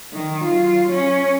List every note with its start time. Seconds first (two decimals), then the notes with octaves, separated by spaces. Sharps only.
0.14 D#3
0.44 F#3 F4
0.92 C#4